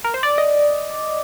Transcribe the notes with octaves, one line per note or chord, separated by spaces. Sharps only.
A#4
C5
D5
D#5